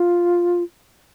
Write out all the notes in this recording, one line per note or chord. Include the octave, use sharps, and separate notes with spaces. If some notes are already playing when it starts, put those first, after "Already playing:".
Already playing: F4